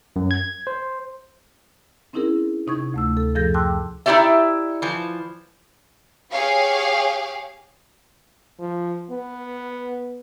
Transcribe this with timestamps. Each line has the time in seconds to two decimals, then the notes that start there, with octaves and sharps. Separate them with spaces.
0.16 F#2
0.31 G#6
0.67 C5
2.13 C4 C#4 D#4 E4 G#4 A#4
2.67 C3 D#4 C#6 G#6
2.94 D2 A3 E6
3.17 A4
3.35 F#2 F3 G#4 A4 G6 A#6
3.54 G5 A5 C6 D6 E6 F#6
4.06 D#4 E4 F#4 G4 D5 E5
4.82 E3 F3
6.32 G4 G#4 C#5 F5
8.59 F3
9.11 B3